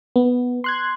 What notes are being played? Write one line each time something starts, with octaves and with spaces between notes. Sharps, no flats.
B3
C6 F#6 G#6